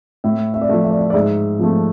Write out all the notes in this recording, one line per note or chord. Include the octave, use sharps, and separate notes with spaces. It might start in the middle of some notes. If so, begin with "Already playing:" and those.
A2 E5
E5
D5
F3 A3 E5
E5
D5
E5
D5
G#2 E5
F3 A3